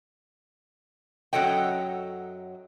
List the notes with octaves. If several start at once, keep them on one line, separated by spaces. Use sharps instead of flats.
F#2 F#3 A4 D#5 G5